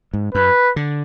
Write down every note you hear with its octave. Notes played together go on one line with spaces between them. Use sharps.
G#2
F#2 B4
D3